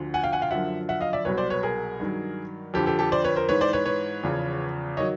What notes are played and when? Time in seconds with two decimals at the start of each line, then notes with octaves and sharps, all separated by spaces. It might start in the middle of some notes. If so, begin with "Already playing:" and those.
Already playing: D2 D3 F3
0.14 F#5 G#5
0.23 F5 G5
0.32 F#5 G#5
0.42 F5 G5
0.51 F#2 D3 F3 E5 F#5
0.89 E5 F#5
1.00 D#5 F5
1.13 D5 E5
1.25 C2 B2 F#3 B4 C#5
1.37 C5 D5
1.50 B4 C#5
1.63 G#4 A#4
2.00 G2 D#3 F#3
2.74 F2 D3 F3 G4 A4
2.86 G4 A4
2.99 G4 A4
3.12 C5 D5
3.24 B4 C#5
3.36 A#4 C5
3.48 G#2 E3 B4 C#5
3.61 C5 D5
3.73 B4 C#5
3.86 B4 C#5
4.23 E2 C#3 F3
4.97 D#3 F#3 C#5 D#5